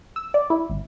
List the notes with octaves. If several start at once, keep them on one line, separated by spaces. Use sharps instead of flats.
E6
D5
E4
G#1